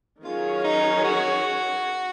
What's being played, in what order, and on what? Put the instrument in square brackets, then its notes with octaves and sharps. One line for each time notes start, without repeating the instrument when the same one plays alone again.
[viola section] D#3 F#3 C#4 G#4 C#5 [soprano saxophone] F4
[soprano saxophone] D#4
F#4